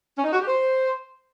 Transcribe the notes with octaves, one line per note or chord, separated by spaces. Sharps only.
C#4
D#4
F#4
G4
C5